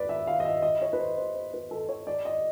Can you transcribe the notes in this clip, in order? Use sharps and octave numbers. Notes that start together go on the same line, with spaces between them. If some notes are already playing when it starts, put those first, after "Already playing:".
Already playing: B4 D5
E5
F5
D#5
E5
D#5
C#5
B4
C5
C5
C5
B4
A4
C#5
D5
D#5